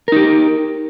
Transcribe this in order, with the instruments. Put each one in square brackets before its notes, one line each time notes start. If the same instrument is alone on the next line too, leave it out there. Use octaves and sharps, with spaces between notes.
[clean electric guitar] A#4
D#4
G4